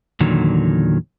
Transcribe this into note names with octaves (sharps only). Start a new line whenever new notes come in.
E2 A#2 D3 D#3 F#3